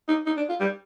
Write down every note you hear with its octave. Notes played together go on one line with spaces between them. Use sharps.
D#4
D#4
D4
F4
G3